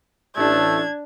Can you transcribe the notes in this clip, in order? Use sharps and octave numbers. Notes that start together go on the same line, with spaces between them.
A1 A3 D4 G#6